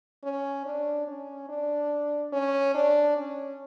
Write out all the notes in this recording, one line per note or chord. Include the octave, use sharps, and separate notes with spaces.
C#4
D4
C#4
D4
C#4
D4
C#4